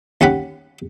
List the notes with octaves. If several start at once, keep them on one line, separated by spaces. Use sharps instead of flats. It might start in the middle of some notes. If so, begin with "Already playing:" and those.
D#2 C#4 G4 F#5 B5